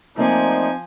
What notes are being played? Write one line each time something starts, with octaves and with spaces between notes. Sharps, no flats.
F3 A3 A#3 C4 D#4 D5 G#5